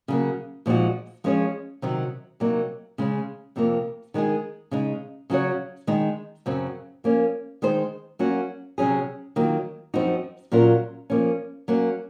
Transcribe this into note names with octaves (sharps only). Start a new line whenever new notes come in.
C#3 F#3 A#3
A#2 F3 G#3 D#4 F#4
F3 G#3 C#4 G#4 C#5
C3 D#3 F#3
C3 F#3 A#3 D#4
C#3 G#3 C#4
F2 C3 F3 A#3
D#3 G#3 D#4 G#4
C#3 G#3 D#4
C#3 F#3 C#4 F#4 C#5
D#3 G#3 D#4
F#2 C#3 F#3 C4
F3 A#3 C#4
D#3 G#3 D#4 G#4 C5
F#3 A#3 C#4 F#4
C3 F#3 C#4 G#4
D#3 F#3 A#3 F4
F#2 F3 C4 D#4 F#4
A#2 F#3 C#4 F4 A#4
F3 A#3 C#4
F#3 A#3 C#4